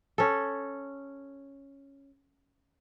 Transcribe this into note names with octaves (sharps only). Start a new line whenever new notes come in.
C#4 A4